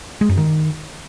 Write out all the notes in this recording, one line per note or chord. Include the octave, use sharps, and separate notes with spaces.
G#3
F#2
D#3